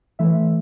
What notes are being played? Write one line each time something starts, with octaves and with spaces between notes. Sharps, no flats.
E3 A3 E5